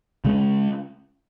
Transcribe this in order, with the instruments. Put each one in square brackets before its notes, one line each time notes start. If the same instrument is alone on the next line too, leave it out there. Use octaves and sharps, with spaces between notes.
[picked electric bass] C#3 G#3 C#4